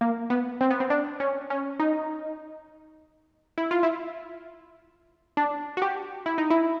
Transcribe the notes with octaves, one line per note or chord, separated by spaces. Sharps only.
A#3
B3
C4
B3
C4
D4
C#4
C#4
D#4
E4
F4
E4
D4
F#4
G4
E4
D#4
E4